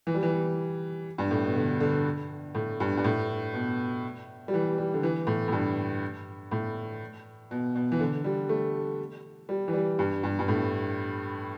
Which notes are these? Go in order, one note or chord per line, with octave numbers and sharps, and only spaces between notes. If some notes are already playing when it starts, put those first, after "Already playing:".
E3
G3
E3
G2
A2
B2
D3
D3
A2
G2
G2
A2
B2
G3
E3
G3
D3
E3
A2
A2
G2
A2
B2
B2
E3
D3
G3
A3
G3
E3
G3
G2
G2
G2
A2